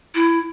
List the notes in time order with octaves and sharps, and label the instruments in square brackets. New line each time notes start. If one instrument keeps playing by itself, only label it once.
[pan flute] E4